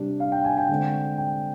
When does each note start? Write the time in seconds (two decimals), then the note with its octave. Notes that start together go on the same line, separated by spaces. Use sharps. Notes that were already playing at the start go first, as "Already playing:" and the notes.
Already playing: C3 G3 D4
0.20 F5
0.32 G5
0.44 G#5
0.57 G5
0.69 D3 G#3 C4
1.18 G5